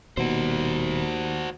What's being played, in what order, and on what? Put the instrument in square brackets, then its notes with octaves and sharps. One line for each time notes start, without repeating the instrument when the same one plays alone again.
[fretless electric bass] D#1 B2 [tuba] D#2 [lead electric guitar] F#4 C5